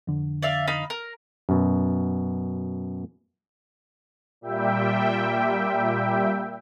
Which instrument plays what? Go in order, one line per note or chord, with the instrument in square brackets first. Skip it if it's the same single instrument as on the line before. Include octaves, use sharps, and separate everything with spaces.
[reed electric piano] F2 D3
[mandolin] D5 E5 F5
D#4 F5 B5
A#4
[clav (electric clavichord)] F#2 B2
[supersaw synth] A#2 G3 E5 G5